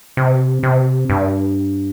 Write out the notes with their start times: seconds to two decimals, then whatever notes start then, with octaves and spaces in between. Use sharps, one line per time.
0.17 C3
0.63 C3
1.10 G2